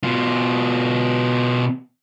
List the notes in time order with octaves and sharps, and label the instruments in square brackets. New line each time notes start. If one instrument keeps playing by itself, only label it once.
[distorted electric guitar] B2 F4